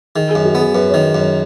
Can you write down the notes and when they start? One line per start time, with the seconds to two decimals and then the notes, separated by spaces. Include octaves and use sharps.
0.16 D#3 G#4
0.30 G#4
0.35 F#2
0.45 F#4
0.55 B3
0.60 G#4
0.75 F#2 B4
0.90 C#5
0.94 D#3
1.15 F#2 C#5